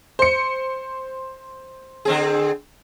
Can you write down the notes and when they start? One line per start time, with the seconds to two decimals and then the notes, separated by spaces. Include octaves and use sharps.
0.19 C5 C#7
2.05 D3 C4 G#4